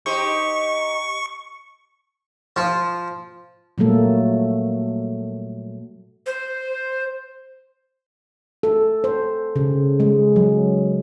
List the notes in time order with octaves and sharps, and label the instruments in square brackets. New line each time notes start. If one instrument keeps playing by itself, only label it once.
[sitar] D#4 G4 C5 [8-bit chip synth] C#6
[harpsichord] F3
[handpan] A#2 F#3 G3 A3 A#3 A4
[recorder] C5
[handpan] A4
C5
C#3
G#3
F#3